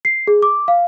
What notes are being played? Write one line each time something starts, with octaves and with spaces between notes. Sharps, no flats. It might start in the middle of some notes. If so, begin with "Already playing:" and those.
C7
G#4
D6
F5